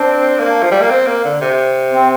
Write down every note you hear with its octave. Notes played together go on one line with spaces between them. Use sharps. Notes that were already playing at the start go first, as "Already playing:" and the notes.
Already playing: C4 D4
A#3
F3
G3
A#3
C4
A#3
D3
C3
C4